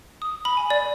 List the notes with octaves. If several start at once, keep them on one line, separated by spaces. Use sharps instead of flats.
D#6
B5
G#5
D5